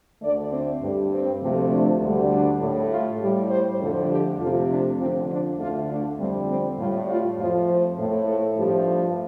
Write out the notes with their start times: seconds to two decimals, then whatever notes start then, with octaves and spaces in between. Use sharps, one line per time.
0.22 D2 D3 A3 D5
0.51 C4
0.81 G2 G3
1.12 C4
1.42 D2 C3 F3 A3
1.71 D4
2.01 D2 D3 G3
2.31 D4
2.60 A2 A3
2.91 F4
3.20 A2 G3 G4
3.50 C5
3.79 F2 D3 F3 A3 A4
4.10 G4
4.39 F2 C3 F3 A3 F4
4.69 D4
4.99 F2 D3 F3 C4
5.29 D4
5.58 D2 D3 A3 F4
5.89 D4
6.18 F2 D3 G3 C4
6.48 C4
6.78 A2 G3 F4
7.08 F4
7.38 F2 F3 A3 F4
7.68 C5
7.98 A2 A3
8.27 A4
8.57 G2 F3 A3 G4